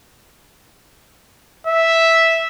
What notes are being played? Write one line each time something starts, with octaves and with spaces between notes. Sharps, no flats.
E5